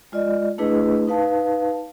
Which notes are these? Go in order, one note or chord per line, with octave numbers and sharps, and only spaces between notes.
G#3 F4 D5 D#5
A3 D4 E4 G#4 B4 D#5
D#4 B4 F5 A5